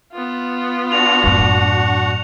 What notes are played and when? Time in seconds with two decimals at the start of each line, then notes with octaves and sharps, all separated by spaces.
0.12 B3 F4
0.92 D4 F#4 F#5 F7
1.24 F#2 A2